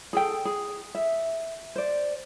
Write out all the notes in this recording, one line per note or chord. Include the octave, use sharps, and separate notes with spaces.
G#4 A4 G5
G#4
E5
C5 D5